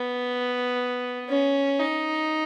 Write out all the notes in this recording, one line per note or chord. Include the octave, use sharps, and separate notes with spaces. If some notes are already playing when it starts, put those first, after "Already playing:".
Already playing: B3
C#4
D#4